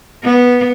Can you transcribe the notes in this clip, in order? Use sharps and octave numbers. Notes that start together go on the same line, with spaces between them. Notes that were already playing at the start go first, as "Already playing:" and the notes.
B3